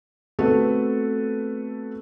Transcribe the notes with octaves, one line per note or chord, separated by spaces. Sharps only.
A3 B3 C4 F#4 A4 B4